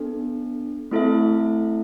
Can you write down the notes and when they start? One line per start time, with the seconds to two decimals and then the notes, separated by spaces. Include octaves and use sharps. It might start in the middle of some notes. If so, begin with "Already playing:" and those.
Already playing: B3 D4 A4
0.91 A3 C4 E4 A4 E5